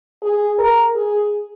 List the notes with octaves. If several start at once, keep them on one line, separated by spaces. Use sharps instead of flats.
G#4
A#4
G#4